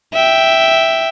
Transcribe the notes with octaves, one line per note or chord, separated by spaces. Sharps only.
E5 G5